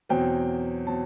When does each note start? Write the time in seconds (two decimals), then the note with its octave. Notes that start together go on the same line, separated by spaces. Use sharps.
0.09 E2 B2 F#3 C4 G5
0.87 B2 F#3 C4 A5